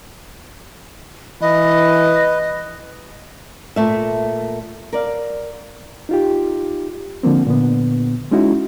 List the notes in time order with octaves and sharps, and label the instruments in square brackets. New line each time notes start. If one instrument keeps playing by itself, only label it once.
[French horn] E3 [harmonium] B4 [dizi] D#5
[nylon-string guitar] A#2 A3 E5
A#4 D5 F5
[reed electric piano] D#4 F4 G4
D3 F3 A#3 C4
A#2 D3 B3
G#3 C#4 D#4 E4 F#4